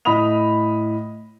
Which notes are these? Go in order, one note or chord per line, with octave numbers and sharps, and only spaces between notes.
A2 D#5 B5 D#6 F7